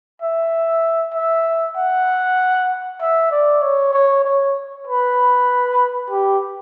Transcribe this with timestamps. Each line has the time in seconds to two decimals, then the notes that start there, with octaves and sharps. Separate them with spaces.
0.22 E5
1.14 E5
1.77 F#5
3.01 E5
3.31 D5
3.62 C#5
3.93 C#5
4.25 C#5
4.87 B4
6.10 G4